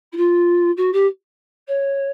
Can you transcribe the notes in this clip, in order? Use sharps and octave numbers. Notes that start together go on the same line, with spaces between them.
E4
F4
F#4
G4
C#5